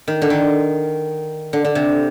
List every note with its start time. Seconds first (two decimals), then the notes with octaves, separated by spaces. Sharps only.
0.08 D#3
0.22 D3
0.30 D#3
1.53 D3
1.65 D3
1.75 C3